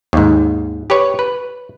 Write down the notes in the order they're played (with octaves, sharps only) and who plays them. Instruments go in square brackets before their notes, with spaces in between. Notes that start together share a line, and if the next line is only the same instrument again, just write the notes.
[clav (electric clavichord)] D#2 G#2
G4 B4 C#5
B4